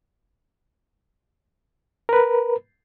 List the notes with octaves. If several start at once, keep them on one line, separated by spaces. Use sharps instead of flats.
A#4 B4